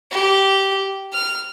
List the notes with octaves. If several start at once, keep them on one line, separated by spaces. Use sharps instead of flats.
G4
F6